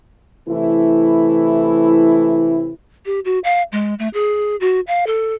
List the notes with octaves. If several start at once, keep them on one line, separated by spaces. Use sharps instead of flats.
C3 E3 A3 E4
G4
F#4
F5
G#3
A3
G#4
F#4
F5
A4